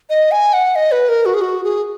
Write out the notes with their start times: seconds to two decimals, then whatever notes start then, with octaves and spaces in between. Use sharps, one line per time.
0.10 D#5
0.32 G#5
0.53 F#5
0.76 D#5
0.92 B4
1.09 A#4
1.26 F#4
1.34 G#4
1.41 F#4
1.64 G#4